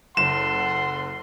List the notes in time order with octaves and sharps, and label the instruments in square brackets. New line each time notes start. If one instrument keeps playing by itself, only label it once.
[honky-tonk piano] F#1 [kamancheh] A4 F#5 [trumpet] C6 [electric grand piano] E7